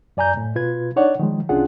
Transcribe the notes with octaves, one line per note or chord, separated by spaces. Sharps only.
F#2 D5 G#5 A#5 G6
A2
B2 F4 B4 G#6
D4 D#4 C#5 D5 F#5
D#3 F3 G#3
C2 C#4 D4 F4 G#4 F#5